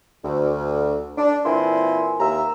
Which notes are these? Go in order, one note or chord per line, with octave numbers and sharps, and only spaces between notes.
D2
D4
A#2 E3 C4 E4 G#5 C6
D#2 E5 A#5